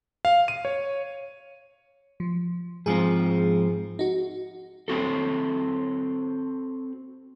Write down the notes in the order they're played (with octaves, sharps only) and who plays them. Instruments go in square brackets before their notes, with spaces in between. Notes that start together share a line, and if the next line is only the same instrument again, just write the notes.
[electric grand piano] F5
D#7
C#5
[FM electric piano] F3
[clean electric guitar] G#2 F3 C4 [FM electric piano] G#4
[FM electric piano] D#4 F#4
[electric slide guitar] C4 F#4 A4